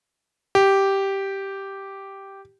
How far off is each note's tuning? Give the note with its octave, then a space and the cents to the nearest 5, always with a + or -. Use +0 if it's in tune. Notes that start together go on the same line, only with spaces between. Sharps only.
G4 -5